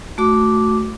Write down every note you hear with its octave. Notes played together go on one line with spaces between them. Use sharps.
A3 F#4 D6